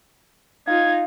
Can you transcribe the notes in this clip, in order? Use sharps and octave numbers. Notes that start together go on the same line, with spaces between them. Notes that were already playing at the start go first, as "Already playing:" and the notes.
D#4 F4 F5 G#6